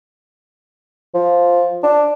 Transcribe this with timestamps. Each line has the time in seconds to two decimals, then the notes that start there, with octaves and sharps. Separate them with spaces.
1.14 F3
1.83 D4